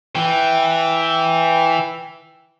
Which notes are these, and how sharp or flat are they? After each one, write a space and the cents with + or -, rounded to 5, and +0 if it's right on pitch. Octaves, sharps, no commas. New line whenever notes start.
E3 +0 G5 +0